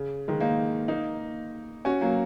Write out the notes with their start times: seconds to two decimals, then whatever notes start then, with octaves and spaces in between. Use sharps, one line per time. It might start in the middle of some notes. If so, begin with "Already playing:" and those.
Already playing: C#3
0.28 D#3 G#3
0.40 A#3 D#4
0.88 A#3 D#4
1.85 C#4 F#4
2.01 F#3 A#3